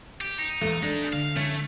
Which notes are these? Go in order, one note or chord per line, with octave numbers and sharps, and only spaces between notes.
G4
D#4
E2 A#2 A3
G#3 D4 D#4
D3 F5
A3 C#4 E4